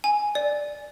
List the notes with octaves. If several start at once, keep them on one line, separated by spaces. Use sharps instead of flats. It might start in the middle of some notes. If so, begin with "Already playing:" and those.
G#5
D5